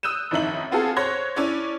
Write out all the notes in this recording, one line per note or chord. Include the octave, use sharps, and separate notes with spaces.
D#6 E6 F#6 G6 D#7 E7
A1 F2 D#3 D#4 E5 F#7
B3 C4 F4 F#4 G#4 A4
C5 C#5 F#6 G#6 A#6
C#4 D4 E4 D5